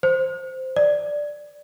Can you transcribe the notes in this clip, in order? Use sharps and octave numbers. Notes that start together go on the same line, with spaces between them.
C5
D5